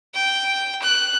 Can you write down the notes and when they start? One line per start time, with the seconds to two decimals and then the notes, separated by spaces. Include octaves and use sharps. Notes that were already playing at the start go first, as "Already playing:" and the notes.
0.15 G5
0.82 F#6